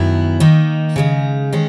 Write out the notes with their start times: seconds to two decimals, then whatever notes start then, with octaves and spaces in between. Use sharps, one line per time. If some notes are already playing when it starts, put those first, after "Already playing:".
Already playing: F#2 D#3 F#3 B3 E4
0.40 D#3 A#3 D#4
0.96 C#3 G#3 D#4
1.53 D#3 G#3 C#4